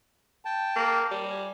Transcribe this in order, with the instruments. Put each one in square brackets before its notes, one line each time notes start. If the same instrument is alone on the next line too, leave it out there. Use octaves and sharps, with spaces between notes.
[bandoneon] G5 A5
[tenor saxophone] A#3
G3
[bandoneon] G#5